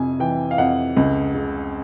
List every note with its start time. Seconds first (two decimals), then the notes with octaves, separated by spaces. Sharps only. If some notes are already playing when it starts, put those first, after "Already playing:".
Already playing: F2 C3 G#5
0.20 E3 G5
0.51 F5
0.58 F2 F#5
0.96 C#2
1.35 C#3